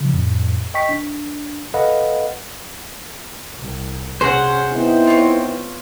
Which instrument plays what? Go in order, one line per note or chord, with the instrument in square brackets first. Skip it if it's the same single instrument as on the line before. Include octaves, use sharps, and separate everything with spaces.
[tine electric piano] C#3 F3
F2 A2
D#5 G5 C#6 B6
D4
A4 B4 D#5 F5 F#5 B5
[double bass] C2
[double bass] C3 C#4 [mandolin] F#4 G#4 [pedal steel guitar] C5 F#5
[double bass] B3 [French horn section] C4 D#4 E4
[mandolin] F4 C#5